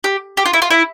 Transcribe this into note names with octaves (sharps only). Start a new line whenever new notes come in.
G4
G4
F4
E4
F4
E4